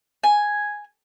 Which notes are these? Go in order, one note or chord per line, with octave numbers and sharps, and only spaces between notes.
G#5